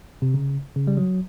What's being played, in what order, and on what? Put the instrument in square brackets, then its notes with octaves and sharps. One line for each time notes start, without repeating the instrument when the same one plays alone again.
[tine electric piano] C3
C#3
C#3
G3
F#3